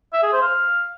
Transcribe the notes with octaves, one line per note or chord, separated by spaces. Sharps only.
E5
G#4
C5
F5